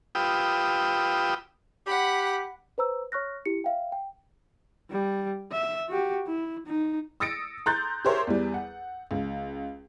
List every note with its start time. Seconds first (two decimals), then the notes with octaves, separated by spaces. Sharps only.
0.15 F4 G4 B4 G5 D#6 E6
1.87 G4 F#5 B5
2.78 B4 C5 A#5 E6
3.12 C#5 C#6 F6 F#6 A#6
3.46 E4 G4 C#7
3.64 E5 F5 G5
3.92 G5
4.90 G3
5.52 E5
5.89 F#4 G4
6.27 E4
6.66 D#4
7.20 D#6 E6 A6 A#6 C#7 D7
7.66 A#5 C6 F#6 G6 A6
8.05 G4 G#4 A#4 C5 C#5 E5
8.27 E2 G3
8.54 F#5
9.11 C#2